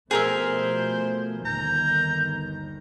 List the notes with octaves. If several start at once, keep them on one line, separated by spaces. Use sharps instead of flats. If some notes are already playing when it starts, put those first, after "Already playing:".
B2 F3 A3 G#4 A#4 C5 E5
G1 D#2 D#3 A#5 G6